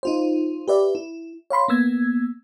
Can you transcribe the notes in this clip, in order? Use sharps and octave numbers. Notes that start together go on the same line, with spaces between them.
D#4 F4 C5
G4 B4 D5 E5
E4
C#5 F5 B5 C6
A#3 B3 E6 G#6